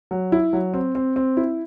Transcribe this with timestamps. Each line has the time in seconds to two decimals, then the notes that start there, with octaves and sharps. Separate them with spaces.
0.11 F#3
0.32 E4
0.53 F#3
0.74 C4
0.95 C4
1.16 C4
1.37 E4